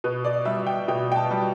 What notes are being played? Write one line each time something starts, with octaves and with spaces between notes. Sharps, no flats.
B2 B4
D5
G3 E5
G5
B2 G5
G5
A5
G3